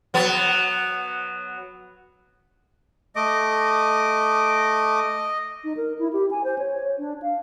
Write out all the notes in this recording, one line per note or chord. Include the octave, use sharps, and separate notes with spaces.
F#3 B3
A3 D#5 D6
D#4
A#4
E4
G4
G#5
C5
C#5
D4
F5